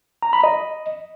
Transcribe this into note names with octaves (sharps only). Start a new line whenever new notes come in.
A#5
B5
D#5